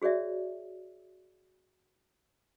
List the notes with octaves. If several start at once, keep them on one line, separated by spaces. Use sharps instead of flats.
F#4 G#4 C#5 D5 E5